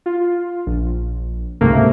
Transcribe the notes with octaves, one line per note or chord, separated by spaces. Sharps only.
F4
A#1
C#2 G#2 C3 A3 A#3